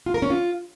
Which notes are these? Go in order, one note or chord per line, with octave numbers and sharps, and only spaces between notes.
F4
A#4
C#4
F4